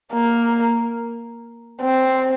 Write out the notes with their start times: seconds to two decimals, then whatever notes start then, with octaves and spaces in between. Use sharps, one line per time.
0.12 A#3
1.82 C4